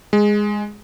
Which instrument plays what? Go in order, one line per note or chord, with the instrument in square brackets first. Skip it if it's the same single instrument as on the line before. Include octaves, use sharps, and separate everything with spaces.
[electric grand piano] G#3